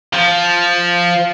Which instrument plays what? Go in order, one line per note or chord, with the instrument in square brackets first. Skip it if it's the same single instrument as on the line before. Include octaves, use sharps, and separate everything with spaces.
[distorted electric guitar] F3